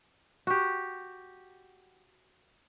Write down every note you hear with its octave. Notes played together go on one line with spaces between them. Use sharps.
F#4 G4